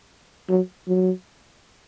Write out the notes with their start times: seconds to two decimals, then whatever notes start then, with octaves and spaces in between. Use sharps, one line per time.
0.49 F#3
0.88 F#3